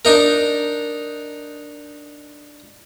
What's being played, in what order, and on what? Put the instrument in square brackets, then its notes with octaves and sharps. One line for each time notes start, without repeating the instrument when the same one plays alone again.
[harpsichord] D4 D#4 A#4